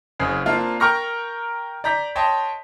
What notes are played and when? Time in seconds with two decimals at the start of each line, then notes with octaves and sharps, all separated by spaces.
0.19 F#1 C#3 C4 G#4 C7
0.46 A#3 C4 D4 F4
0.80 A#4 G5 A#5 C#6 F6 A#6
1.84 D5 A#5 G6 B6
2.15 C#5 D#5 G5 A5 C6